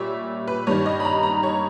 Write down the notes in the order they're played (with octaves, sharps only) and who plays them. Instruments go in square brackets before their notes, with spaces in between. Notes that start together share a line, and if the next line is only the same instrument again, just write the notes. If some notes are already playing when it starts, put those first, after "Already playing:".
Already playing: [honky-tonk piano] A#2 G3 C#5 E5
B4
G2 D#3 G3 C#5
D#5
B5
A#5
A#5
C#5